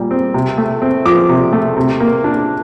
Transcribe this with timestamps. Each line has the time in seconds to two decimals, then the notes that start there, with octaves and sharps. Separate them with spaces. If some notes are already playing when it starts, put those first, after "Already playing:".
Already playing: A#2 G3
0.11 C4
0.34 C3
0.58 A3
0.82 C4
1.05 F3 D6
1.29 C3
1.53 A3
1.77 C3
2.00 A#3
2.24 D4